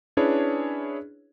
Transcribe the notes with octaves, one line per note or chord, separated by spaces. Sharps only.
C#4 D4 E4 G#4 B4 C#5